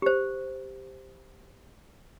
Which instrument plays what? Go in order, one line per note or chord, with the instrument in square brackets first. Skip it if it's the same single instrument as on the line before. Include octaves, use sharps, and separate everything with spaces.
[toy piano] G4 C5